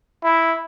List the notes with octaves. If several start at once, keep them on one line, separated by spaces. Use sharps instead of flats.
E4